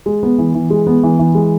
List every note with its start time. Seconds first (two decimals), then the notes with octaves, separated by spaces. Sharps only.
0.06 G#3
0.23 B3
0.38 E3
0.55 E3
0.70 G#3
0.87 B3
1.03 E3
1.19 E3
1.35 G#3